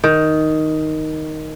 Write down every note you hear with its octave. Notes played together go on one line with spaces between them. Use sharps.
D#3